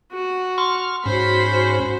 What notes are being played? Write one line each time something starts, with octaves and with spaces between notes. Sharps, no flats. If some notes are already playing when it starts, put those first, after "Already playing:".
F#4
C6 C#6 F6
G#2 C#4 F#4 C5 B5